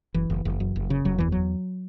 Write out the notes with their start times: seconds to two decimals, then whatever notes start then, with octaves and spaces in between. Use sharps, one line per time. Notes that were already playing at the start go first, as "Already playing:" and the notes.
0.14 F#1 E3
0.30 F#1
0.45 F#1
0.60 F#2
0.76 F#1
0.90 C#3
1.05 F#1 F#3
1.18 E2 E3
1.32 F#3